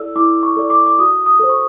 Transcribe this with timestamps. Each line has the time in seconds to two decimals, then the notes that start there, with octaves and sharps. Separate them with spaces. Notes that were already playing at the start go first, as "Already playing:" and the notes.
Already playing: E4 A4 D5 E6
0.16 E4 D6
0.43 C#6
0.56 A4 D5
0.70 D6
0.86 D6
0.99 F#4 D#6
1.26 D#6
1.40 A4 C5
1.49 C#6